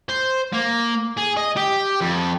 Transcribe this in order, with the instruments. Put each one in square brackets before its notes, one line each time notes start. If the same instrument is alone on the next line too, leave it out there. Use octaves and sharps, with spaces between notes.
[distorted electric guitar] C5
A#3
G#4
D#5
G4
F2